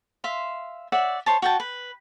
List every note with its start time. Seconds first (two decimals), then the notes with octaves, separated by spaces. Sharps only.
0.24 E5 F5 C6
0.92 C#5 D5 E5 F#5
1.26 C5 C#5 A5
1.42 F#4 G5 A5
1.60 B4